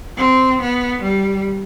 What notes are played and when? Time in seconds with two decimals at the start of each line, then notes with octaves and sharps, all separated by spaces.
0.17 C4
0.62 B3
1.03 G3